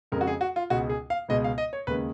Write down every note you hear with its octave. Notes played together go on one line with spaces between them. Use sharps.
F2 C#3 G#3 A#4
F#4
G#4
F#4
F4
C#2 B2 G#3 F#4
G#4
F5
C#2 B2 G#3 D#5
F5
D#5
C#5
D#2 C#3 G#3 B4